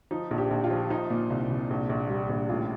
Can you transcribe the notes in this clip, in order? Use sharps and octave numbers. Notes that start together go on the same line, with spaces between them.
F3 D#4
A#1
G4
A#1
F4
F3
F3 D#4
A#2
C2
C2
A#1
A#1
G3
A#1
A1 F4